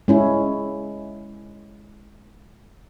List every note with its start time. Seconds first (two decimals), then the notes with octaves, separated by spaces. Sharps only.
0.08 G#3 C#4 E4